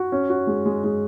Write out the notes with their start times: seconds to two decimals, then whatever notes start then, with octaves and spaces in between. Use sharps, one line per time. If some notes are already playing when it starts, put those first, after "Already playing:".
Already playing: F#4
0.12 C#4
0.30 F#4
0.47 G#3
0.66 G#3
0.84 G#3